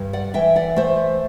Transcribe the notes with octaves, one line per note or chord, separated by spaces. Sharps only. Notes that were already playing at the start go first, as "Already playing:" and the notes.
Already playing: G2
D5 F#5
E3 E5 G5
D5 F#5
A3 C5 E5